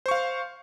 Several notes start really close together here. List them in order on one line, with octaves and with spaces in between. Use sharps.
C5 C#6 F5